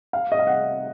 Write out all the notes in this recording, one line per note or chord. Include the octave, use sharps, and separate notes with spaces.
F5
D#5
F5
F#5